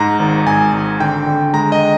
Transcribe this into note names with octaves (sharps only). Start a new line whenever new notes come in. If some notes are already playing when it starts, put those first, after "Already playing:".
Already playing: G#2 A#5
G#1
G#1 G#5
G#1
D3 G5
D3
G#3 A#5
D#5